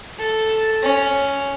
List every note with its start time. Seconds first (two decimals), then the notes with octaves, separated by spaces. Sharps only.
0.19 A4
0.83 C#4